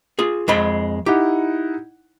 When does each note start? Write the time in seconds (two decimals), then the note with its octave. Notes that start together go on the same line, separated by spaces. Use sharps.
0.19 F4 G#4
0.48 F2 G#3 B5
1.06 D#4 E4 G4 F#5